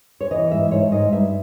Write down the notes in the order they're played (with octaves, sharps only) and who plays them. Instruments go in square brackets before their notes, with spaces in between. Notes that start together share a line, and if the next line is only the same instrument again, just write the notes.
[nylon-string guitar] C#5
E3 D#5
G#2 E5
G#2 C#5
G#2 D#5
G2 E5